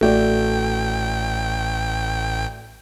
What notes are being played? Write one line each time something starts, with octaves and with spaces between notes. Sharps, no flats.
A1 A3 F#4 D5 G5